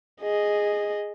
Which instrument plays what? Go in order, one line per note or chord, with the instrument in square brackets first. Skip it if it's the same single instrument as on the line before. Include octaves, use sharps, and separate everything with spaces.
[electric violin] G#4 D#5